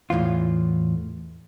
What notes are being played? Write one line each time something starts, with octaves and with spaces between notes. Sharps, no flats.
E2 A2 E3 F4